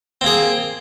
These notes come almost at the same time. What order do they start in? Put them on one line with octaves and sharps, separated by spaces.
C4 A#3 G#4